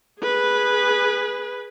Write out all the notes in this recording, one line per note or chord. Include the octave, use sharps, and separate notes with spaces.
G#4 B4